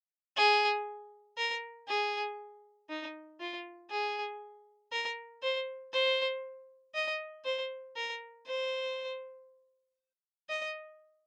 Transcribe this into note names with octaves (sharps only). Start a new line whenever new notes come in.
G#4
A#4
G#4
D#4
F4
G#4
A#4
C5
C5
D#5
C5
A#4
C5
D#5